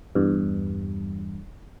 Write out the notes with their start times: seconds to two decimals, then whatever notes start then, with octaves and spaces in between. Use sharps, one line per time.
0.15 E2 G2